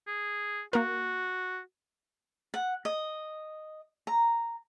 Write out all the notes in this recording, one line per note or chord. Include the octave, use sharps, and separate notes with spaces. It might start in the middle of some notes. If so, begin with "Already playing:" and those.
G#4
A#3 F#4 A#4
F#5
D#5
A#5